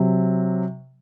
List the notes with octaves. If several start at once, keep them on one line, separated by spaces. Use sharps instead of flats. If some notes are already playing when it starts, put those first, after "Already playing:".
Already playing: C3 F#3